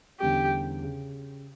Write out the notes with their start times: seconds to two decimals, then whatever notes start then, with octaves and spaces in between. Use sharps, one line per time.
0.20 E2 D3 G3 C#4 G4
0.83 C#3